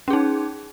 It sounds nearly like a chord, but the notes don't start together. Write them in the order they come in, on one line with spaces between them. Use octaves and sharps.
C#4 G#4 D#4